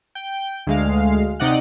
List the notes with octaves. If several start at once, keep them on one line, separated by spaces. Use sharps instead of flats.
G5
D2 G#3 F5
C3 D#4 D5 D#5 F#5 F#6